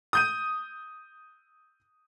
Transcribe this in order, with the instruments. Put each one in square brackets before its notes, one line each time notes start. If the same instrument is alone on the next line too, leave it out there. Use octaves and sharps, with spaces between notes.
[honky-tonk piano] D#6 G6 D#7